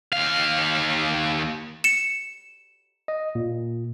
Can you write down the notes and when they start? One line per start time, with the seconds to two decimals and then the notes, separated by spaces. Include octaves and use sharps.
0.13 D#2 F5
1.84 C#7 E7
3.08 D#5
3.35 A#2